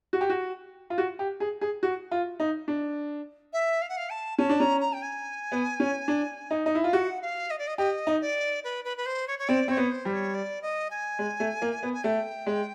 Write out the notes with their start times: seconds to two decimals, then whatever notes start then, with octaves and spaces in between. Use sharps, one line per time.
0.13 F#4
0.21 G4
0.30 F#4
0.90 F4
0.98 F#4
1.19 G4
1.40 G#4
1.61 G#4
1.83 F#4
2.11 F4
2.40 D#4
2.68 D4
3.53 E5
3.82 F5
3.89 F#5
3.97 F5
4.10 A5
4.38 C#4 A5
4.49 D4
4.59 C#4 A#5
4.81 A#5
4.93 G5
5.02 G#5
5.52 B3
5.80 C#4
6.08 D4
6.51 D#4
6.66 D#4
6.75 E4
6.84 F4 F5
6.93 F#4 F#5
7.22 F5
7.50 D#5
7.58 D5
7.67 D#5
7.78 G4 D#5
8.07 D#4
8.21 D5
8.64 B4
8.85 B4
8.97 B4
9.06 C5
9.27 C#5
9.39 C#5
9.48 C4 D5
9.68 C4 C#5
9.77 B3
9.91 C5
10.05 G3
10.13 C#5
10.34 D5
10.62 D#5
10.90 G#5
11.19 G#3
11.40 A3
11.62 A#3
11.83 B3
11.94 G#5
12.04 A3 G5
12.46 G#3